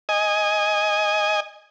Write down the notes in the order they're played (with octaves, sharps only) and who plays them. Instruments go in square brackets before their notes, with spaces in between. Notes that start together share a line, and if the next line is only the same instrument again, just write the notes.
[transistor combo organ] D#5 G#5